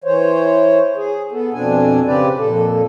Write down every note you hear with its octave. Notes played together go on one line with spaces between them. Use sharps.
E3 C5 C#5
G#4
B3 A4
F2 B2 C4 D4 G#5
C#3 C4 G4 B4 D5
F2 A#2 A4